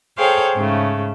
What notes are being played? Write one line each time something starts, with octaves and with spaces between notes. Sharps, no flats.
G#4 A4 C5 C#5 F5 G5
G#2 C#3 A3